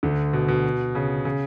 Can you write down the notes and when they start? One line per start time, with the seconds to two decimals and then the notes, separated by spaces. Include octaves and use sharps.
0.03 D2 D3
0.33 B2
0.48 B2
0.95 C#3
1.25 C#3